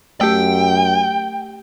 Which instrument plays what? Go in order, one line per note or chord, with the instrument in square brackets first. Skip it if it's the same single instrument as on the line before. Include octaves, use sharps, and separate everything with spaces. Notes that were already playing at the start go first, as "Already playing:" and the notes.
[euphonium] F#2 [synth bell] A3 G4 [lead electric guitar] G5